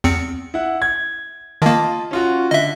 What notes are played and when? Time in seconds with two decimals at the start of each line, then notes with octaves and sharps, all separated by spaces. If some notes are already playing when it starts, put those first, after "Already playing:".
0.04 E2 C4 C#7
0.54 E4 F#5
0.82 G#6
1.62 D#3 A#3 F4 D#5 A5
2.11 C#4 F4 F#4
2.51 D3 D#5 E5